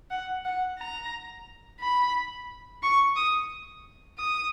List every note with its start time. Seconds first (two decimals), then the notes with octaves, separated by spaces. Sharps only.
0.11 F#5
0.45 F#5
0.79 A#5
1.81 B5
2.83 C#6
3.16 D#6
4.18 D#6